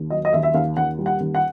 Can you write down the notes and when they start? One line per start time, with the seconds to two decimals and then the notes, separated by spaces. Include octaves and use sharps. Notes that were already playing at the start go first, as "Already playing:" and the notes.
Already playing: D#2
0.10 F#3 D#5
0.25 D#5
0.33 D#2 E5
0.43 E5
0.54 D#2 F5
0.77 D#2 F#5
0.99 G3
1.06 F#5
1.20 D#2
1.35 F#5